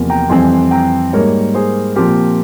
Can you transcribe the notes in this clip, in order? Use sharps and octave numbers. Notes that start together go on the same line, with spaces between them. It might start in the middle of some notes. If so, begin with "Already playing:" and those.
Already playing: E2 C3 F3 A#3
G5 A#5
F2 E3 G3 C4 G#5 C6
G5 A#5
G#2 G3 A#3 A#4 C#5
G#4 C5
A#2 F3 C4 G4 A#4